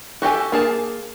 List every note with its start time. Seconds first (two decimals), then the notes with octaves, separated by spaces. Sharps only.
0.22 F#4 G4 A4 G#5
0.52 A#3 G#4 A5